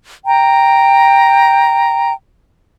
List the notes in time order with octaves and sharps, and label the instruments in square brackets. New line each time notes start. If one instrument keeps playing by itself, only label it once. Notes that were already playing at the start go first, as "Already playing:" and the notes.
[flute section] G5 A#5